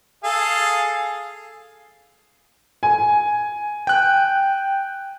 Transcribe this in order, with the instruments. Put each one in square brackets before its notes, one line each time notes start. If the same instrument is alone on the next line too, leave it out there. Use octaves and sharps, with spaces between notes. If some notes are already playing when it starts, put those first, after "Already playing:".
[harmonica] G#4 A4 F5
[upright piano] G#5
[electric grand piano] G5 F#6